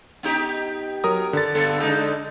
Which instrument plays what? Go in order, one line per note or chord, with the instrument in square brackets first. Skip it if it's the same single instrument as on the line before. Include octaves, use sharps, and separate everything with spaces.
[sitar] B3 D#4 G4
[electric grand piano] F#3 A#4 D#6
D3 A6
[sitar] G2 B3 A4
G#3 D4 D#4